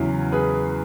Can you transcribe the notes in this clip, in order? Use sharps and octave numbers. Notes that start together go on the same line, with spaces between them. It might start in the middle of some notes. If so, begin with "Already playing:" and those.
Already playing: E2 C#3 F#3 C#4 E4
G#4 B4